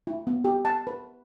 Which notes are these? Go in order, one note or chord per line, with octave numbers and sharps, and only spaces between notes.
E4
B3
G4
A5
B4